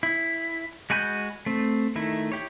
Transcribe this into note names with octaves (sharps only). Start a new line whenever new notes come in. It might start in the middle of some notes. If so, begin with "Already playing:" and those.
E4
G#3 F#4 G#5 B5 G6
A3 C4
D#3 A3 E4
E4 G4 C#5